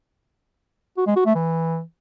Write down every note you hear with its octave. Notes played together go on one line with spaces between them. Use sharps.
F#4
G#3
F#4
A3
E3